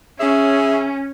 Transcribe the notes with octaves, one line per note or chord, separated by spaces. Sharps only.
C#3 C#4 G#4 E5